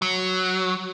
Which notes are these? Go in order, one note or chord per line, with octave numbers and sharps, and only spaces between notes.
F#3